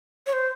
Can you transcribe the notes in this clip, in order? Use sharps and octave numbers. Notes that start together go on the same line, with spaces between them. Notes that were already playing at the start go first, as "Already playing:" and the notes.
C#5
C5